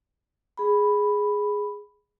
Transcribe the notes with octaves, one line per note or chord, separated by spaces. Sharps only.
G#4 B5